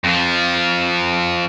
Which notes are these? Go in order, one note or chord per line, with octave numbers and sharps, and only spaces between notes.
F2 F3